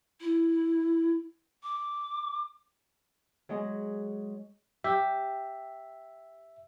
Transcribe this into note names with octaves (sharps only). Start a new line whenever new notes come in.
E4
D6
F#3 G#3 D#5
G4 E5